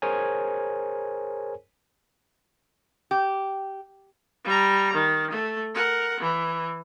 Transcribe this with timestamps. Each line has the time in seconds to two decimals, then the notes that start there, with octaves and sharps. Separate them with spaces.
0.02 G#4 A#4 C5 C#5 G#5
3.11 G4
4.45 G3 A#5
4.94 D#3
5.31 A3
5.74 A#4 F#5
6.20 E3